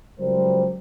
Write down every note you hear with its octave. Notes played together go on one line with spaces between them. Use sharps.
C#2 F#3 G3 A#4 C5